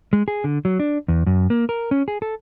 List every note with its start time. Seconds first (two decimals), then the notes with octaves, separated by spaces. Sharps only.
0.13 G#3
0.28 G#4
0.44 D3
0.65 F#3
0.79 D4
1.08 E2
1.26 F#2
1.50 A#3
1.69 A#4
1.91 C#4
2.08 G#4
2.22 A4